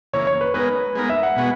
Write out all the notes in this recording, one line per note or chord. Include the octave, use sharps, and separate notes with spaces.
C#3 E3 A#3 C#5
C#5
B4
G#3 B3 D#4 A#4 B4
G#3 B3 D#4 A#4
E5
F#5
B2 G#3 B3 F#4